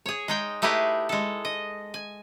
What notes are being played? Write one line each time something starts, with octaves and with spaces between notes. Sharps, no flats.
G#4 C#5
G#3 D#4 G5
A3 D#4 E4 G4 G#4 B4
G#3 A4
D#5
G#5